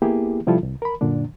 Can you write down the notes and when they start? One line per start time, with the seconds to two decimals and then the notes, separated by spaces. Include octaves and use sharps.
0.02 A#3 B3 E4 G4 G#4
0.47 C3 F3 G3 E4 F4 A4
0.63 C2
0.82 A#4 B5
1.01 F#2 A#2 D3 D4